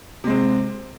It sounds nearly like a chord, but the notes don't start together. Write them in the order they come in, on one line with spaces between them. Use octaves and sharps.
C3 G#3 C4